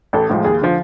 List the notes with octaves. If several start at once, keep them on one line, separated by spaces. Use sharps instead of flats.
A1 A4
A2 F3 G#3
D#2 G#4
D3 F3